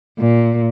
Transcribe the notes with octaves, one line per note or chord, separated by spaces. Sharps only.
A#2